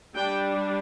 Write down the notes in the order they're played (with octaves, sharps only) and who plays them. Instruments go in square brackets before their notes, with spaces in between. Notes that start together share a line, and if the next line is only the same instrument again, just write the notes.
[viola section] G3 D4 G5